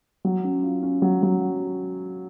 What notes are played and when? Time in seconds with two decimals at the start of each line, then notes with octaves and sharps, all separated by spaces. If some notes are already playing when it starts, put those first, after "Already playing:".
0.25 F#3
0.44 C#4
0.63 F4
0.83 C#4
1.02 F#3
1.23 F#3